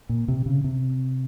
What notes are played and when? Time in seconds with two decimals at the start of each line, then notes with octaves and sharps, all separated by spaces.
0.09 A#2
0.28 C3
0.46 C#3
0.64 C3